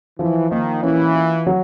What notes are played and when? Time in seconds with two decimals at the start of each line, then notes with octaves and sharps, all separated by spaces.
0.19 E3 F3
0.50 D#3 A#3
0.83 E3 C#4
1.15 F4
1.47 F#3